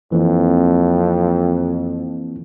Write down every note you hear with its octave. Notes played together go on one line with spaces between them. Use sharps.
F2 E3 A#3 C4